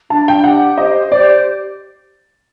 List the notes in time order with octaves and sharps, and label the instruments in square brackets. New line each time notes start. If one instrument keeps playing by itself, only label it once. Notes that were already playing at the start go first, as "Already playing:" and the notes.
[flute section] D4 [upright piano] A5
[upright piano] G5
[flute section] G4 [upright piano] F#5
[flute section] C5 [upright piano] D#5
[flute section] G4 [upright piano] D5